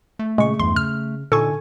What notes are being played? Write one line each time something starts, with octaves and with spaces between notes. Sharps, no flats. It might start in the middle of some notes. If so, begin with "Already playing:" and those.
A3
A#2 C#3 G#3 C#6
E2 G2 E3 C6
C#3 F6
A#2 D3 D#4 A4 G#5 C#6